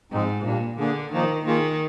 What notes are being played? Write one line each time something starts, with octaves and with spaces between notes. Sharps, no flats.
G#2 F3 G#3 C4 D#4
A#2 G3 A#3 D4
D3 A#3 D4 G#4
A#2 D#3 F3 A#3 D#4
D#3 A#3 F4 G#4